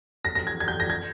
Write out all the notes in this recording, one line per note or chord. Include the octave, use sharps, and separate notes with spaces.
A#6
A#6
G#6
G#6
G6
A#6
G#6